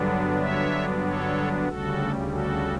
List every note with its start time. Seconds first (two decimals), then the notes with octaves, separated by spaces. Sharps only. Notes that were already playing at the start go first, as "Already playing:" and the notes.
Already playing: G2 D3 F#3 B3 D4
0.41 C#5 E5
1.04 A4 C#5
1.68 D2 C#3 G3 F#4 A4
2.31 F#4 A4